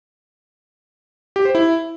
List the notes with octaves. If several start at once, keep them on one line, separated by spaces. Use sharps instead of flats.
G4
C5
E4